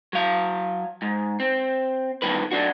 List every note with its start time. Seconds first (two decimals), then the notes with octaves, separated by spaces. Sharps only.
0.13 F#3 F5
1.02 G#2
1.40 C4
2.22 E2 G2 D#3 B4
2.51 F#3 D4 F#4